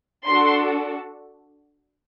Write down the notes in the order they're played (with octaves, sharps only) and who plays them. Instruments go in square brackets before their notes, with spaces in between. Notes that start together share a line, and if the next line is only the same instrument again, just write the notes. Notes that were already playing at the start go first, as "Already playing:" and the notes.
[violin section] D4 F#4 A4 C6